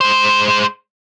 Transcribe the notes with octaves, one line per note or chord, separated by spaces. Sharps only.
G#3 C5